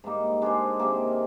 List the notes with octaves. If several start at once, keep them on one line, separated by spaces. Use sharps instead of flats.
G#2 G3 A#3 D#4
G#3 D4 G#4 C5
C3 D#3 A#3